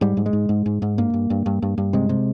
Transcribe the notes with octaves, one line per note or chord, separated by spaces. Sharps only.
G#2 G3
G#2
G#3
G#2
G#2
G#2
G#2
G2 A#3
G2
G2
G2
G2
G2
C3 G#3
C3